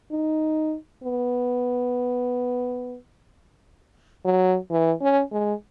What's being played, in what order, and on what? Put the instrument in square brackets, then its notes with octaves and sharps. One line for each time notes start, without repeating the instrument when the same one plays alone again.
[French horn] D#4
B3
F#3
E3
C#4
G#3